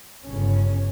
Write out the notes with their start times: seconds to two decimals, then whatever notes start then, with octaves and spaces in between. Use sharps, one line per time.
0.25 G1 C#3 C#4